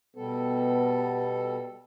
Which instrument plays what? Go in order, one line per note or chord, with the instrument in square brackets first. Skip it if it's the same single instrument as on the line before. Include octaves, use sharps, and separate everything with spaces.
[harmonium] B2 G3 A4 [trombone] B3